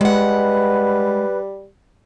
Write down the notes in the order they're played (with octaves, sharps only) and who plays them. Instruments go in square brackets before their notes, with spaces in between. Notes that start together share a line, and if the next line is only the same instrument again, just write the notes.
[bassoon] G3 [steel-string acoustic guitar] G#3 F#5 [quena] B4